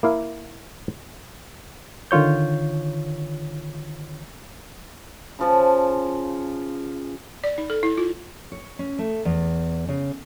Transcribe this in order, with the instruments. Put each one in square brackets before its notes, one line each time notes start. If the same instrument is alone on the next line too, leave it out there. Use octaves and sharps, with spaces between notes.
[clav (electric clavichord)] A#3 E4 F5
[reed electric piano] D3 D#3 F4 C#5 G6
[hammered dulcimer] C#3 F3 A5
[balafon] D5
D#4
A4
E4
F4
[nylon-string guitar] C#5
C#4
A3
E2
C#3